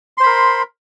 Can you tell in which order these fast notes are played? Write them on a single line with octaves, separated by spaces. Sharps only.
C6 C5 B5 A#4